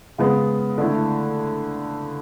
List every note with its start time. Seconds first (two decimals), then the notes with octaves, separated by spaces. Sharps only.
0.18 C#3 G#3 B3
0.78 D3 A3 E4